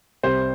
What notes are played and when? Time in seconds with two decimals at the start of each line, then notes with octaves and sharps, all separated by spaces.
0.23 C2 C3 G3 C5